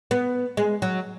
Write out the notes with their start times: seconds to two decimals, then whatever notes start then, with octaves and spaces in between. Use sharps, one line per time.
0.11 B3
0.57 G#3
0.82 F#3